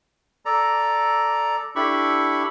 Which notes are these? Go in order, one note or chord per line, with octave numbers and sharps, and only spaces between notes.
A4 D5 A#5
D4 E4 G4 A4 B5 C#6